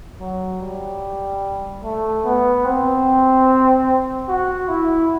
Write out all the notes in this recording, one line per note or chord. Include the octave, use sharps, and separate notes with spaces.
F#3
G3
A3
B3
C4
F#4
E4